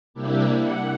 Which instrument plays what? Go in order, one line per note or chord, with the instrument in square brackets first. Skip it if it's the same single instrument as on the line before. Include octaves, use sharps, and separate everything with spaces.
[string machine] C3 G3 A#3 D4 E4 G4
F#5